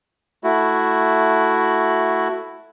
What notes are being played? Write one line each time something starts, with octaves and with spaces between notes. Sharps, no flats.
A3 E4 F#4